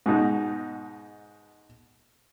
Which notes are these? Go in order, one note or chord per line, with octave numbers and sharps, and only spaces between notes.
G#2 B2 D#4 F#4